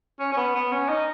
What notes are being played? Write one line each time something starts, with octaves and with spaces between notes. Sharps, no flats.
C#4
C#4
B3
B3
C#4
D#4